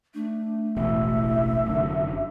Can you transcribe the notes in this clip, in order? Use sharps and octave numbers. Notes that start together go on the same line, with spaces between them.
A3 D4
E1 A1 E5
F1 F#2 D3